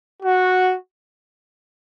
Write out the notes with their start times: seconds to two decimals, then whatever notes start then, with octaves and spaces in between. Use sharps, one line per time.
0.23 F#4